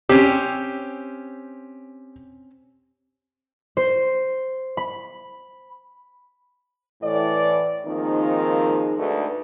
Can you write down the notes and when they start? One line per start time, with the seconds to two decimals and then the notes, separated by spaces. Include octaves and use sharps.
0.09 C4 C#4 G4
3.77 C5
4.77 B5
7.02 A2 E3 D5
7.85 D#3 F3 G#3 A#3 C4 D#4
8.97 D2 G#2 A3 B4